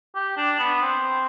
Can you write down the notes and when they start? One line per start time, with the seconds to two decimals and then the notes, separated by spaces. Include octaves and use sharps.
0.15 G4
0.37 D4
0.59 B3
0.82 C4